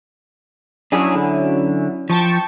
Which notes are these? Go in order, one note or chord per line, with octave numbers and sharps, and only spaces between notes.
F#3 C#4 D4 E4 G#4
D3
F3 G5 A5 C#6